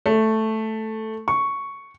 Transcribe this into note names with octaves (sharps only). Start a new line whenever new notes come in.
A3
C#6